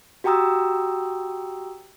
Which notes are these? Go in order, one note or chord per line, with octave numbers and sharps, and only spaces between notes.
F#4 G4 G5 A#5 D#6 E6